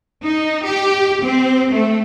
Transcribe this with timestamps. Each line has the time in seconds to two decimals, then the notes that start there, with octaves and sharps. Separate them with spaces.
0.23 D#4
0.65 G4
1.23 C4
1.72 A3